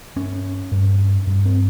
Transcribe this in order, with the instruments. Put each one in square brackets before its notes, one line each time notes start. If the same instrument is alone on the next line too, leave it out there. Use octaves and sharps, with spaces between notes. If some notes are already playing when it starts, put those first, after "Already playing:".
[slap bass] G2 C#4
G2
G2
C4